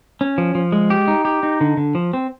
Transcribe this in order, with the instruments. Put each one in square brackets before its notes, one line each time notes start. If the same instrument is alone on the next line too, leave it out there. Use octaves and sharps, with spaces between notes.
[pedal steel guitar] C#4
F3
F3
G#3
G4
D#4
G4
D#4
D3
D3
F3
C4